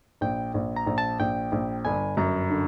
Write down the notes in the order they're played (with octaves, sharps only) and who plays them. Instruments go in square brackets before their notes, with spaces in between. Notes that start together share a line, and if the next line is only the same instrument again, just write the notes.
[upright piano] A#1 [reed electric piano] G5
[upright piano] A#1
[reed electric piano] A#5
[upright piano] A#1
[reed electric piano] A5
[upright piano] A#1 [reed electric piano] G5
[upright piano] A#1
[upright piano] G1 [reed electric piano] G#5
[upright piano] F#2 [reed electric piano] A#5
[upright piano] D3